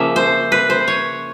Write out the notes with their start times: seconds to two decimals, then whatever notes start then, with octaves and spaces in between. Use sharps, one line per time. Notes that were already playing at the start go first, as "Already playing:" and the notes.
Already playing: C#3 F3 A#3 E5
0.16 C5
0.52 B4
0.70 C5
0.88 C#5